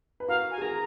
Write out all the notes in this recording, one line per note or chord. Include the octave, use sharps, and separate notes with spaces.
B4
F#4 A#4 F5
G#5
G#4
F#4 A#4 A#5